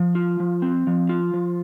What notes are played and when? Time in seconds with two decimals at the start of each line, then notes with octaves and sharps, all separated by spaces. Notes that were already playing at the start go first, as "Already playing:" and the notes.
Already playing: F3
0.15 F4
0.40 F3
0.62 C4
0.87 F3
1.09 F4
1.34 F3